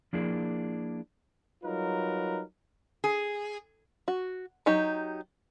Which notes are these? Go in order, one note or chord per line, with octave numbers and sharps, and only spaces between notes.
F3 A#3 D4 E4 G#4 A#4
F#3 G3 D#4 F4 A#4 B4
G#4
F#4
F#3 D#4 G4